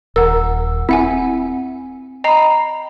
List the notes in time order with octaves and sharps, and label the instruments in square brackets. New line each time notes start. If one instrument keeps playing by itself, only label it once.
[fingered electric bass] D#1 [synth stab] A#4 [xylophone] F#5 E6
[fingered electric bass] C4 [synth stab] E4 [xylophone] E5 F#5 G#5
[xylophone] D#5 A#5 C7 [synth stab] G5 B5